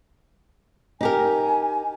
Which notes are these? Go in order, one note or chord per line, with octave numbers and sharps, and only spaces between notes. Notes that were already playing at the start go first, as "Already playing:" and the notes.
D#4 G4 A#4 G#5